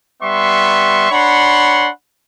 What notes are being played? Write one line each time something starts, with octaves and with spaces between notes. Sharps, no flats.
G3 B3 E5 C6 C#6
D4 C#5 F#5 B5 C6